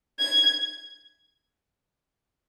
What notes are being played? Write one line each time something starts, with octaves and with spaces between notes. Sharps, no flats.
G#6